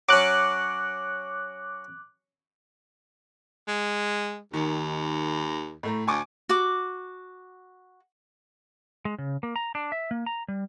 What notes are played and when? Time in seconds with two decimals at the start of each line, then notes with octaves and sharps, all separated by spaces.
0.09 F#3 C#4 D6 F#6
3.68 G#3
4.54 D#2 D#3
5.83 A2 A3 A#5
6.08 D2 G#5 C#6 D6
6.49 F#4 D6
9.05 G#3
9.18 C#3
9.43 A#3
9.56 A#5
9.75 D4
9.92 E5
10.11 A#3
10.26 A#5
10.48 G3